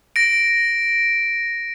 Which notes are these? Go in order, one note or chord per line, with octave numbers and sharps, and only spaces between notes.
A#6 D7